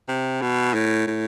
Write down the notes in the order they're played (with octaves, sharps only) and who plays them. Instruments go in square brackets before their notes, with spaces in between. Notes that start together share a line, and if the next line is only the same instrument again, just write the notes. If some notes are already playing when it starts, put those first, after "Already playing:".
[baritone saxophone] C3
B2
A2
A2